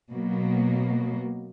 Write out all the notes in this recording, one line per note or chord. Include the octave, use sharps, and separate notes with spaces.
B2 F#3 A#3